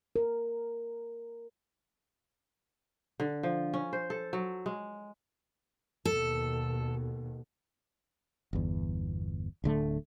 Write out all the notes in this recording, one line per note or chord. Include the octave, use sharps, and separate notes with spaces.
A#4
D3
F3
C#4
C5
A4
F#3
G#3
D#2 B2 A4
G1 E2
D1 D3 A3